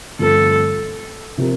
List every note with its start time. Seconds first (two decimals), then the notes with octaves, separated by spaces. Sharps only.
0.19 G2 D3 F3 A3 C4 A4
1.38 C3 F3 C4 G4 A#4